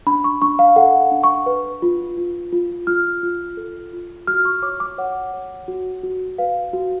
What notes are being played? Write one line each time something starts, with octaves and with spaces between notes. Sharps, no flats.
D4 B5
C#6
D4 C#6
F5
A4 F#5
D4
C#6
B4
F4
F4
F4
F4 F6
F4
A4
F4
F#4 F6
C#6
C#5 D6
D6
C#5 F#5
C#5
F#4
F#4
B4 F5
F#4